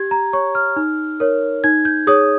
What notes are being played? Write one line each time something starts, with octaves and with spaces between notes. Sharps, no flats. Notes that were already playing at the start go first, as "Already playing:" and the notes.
Already playing: G4 G#6
A#5
C#5 C#6
F6
D#4
A#4 C#5
D#4 G#6
G6
G#4 C#5 D#6